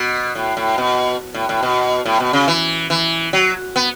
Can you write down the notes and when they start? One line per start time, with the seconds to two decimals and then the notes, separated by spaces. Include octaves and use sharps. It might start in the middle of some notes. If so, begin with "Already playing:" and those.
Already playing: B2
0.35 A2
0.57 A2
0.78 B2
1.34 A2
1.49 A2
1.63 B2
2.05 A2
2.20 B2
2.33 C#3
2.48 E3
2.90 E3
3.33 F#3
3.76 B3